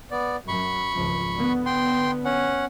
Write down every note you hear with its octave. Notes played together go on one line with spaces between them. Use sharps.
B3 D5
F#2 B5 C#6
G#1 C#2 F3
D3 B3
G5 C6
C#4 F#5